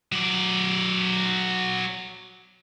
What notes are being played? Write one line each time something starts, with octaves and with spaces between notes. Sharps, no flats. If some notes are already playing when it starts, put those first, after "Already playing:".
F#3 D5